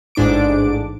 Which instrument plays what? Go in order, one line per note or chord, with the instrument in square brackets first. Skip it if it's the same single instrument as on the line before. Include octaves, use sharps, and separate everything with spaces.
[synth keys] A1 G#2 D4 D6 D7